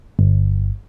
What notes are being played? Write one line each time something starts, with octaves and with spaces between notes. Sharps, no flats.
G1